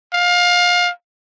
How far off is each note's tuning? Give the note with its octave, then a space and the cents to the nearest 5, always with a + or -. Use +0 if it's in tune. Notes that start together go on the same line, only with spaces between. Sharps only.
F5 +25